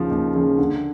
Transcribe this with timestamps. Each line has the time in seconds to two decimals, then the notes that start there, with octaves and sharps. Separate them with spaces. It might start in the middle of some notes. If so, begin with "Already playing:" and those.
Already playing: D#2 C#3 F3
0.10 D#2
0.35 C#3 F3
0.58 D3